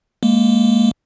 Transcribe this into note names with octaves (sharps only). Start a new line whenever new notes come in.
G#3 A#3